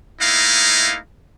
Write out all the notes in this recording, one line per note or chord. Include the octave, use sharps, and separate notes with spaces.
A3 A#3 D#4 E4 D#5 F5